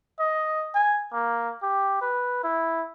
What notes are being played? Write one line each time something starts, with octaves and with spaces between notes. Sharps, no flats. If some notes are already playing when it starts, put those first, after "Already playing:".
D#5
G#5
A#3
G4
B4
E4